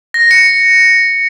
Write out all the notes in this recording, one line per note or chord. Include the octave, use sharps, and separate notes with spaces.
A#6
C#7